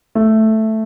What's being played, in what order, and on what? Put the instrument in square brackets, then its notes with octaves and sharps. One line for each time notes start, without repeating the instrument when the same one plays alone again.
[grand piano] A3